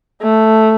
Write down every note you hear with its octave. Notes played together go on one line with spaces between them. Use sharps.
A3